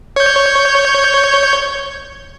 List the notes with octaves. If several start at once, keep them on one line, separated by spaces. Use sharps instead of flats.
C#5 G6